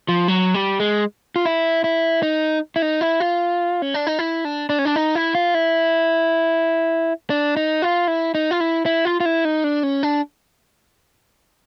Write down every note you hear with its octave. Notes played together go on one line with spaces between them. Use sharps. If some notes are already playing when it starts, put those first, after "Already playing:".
F3
F#3
G3
G#3
F4
E4
E4
D#4
E4
D#4
E4
F4
C#4
D4
D#4
E4
D4
D4
C#4
D4
D#4
E4
F4
E4
D4
D#4
F4
E4
D#4
F4
E4
E4
F4
F4
E4
D#4
D4
C#4
D4